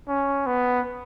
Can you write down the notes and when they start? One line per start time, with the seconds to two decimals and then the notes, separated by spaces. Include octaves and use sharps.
0.08 C#4
0.46 B3